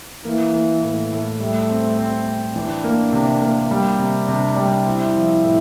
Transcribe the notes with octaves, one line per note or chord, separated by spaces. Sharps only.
E3 A#3
A#3
A2
A2
G3 A3
C4
C4
C4
E3 D4
A#3
C3
A#3
G3
C3
C3 D4
G3
C4 E4
F3
A2